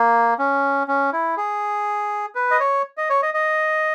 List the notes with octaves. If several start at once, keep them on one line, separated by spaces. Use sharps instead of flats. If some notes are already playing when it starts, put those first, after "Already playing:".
Already playing: A#3
C#4
C#4
E4
G#4
B4
D#5
C#5
D#5
C#5
D#5
D#5